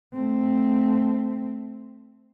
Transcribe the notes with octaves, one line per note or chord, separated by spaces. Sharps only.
A3 C4